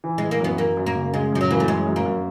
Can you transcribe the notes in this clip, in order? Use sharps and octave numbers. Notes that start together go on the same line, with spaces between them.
E3
E3 G#3
A#3
F#2 B3
F#2 A#3
F#2
A#3
C#3
C#3 G#3
F#2 F3
F#3
E3 A#3
A3
F#2 G#3
F#2
A#3
F#2